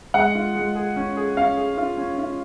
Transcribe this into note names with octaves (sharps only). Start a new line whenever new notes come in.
G#3 F#5
F4
G#3
G#4
C#4
G#4
C#4 F5
G#4
F4
C#4
F4